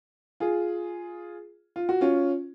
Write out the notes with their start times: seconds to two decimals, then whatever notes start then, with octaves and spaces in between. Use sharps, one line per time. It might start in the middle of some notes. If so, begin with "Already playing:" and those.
0.40 F4 G#4
1.76 F4
1.89 F#4
2.01 C#4 F4